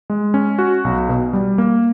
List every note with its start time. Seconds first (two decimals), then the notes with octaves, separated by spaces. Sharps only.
0.10 G#3
0.34 C#4
0.59 F#4
0.85 B1
1.09 B2
1.33 G3
1.58 A#3